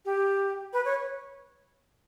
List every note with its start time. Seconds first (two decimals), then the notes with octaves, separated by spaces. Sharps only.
0.05 G4
0.73 B4
0.85 C#5